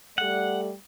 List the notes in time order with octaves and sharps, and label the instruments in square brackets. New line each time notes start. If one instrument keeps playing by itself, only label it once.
[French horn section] G3 A3 D5 [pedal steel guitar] F#5